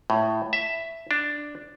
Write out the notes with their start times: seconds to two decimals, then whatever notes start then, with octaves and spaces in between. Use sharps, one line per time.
0.10 A2
0.53 E5
1.11 D4